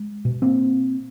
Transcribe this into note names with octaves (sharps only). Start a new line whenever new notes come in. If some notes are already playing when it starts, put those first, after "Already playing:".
Already playing: G#3
B2
A#3 C4